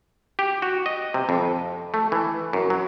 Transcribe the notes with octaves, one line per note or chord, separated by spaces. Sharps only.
G4
F#4
D#5
C3
F2
A3
E3
F#2
F#3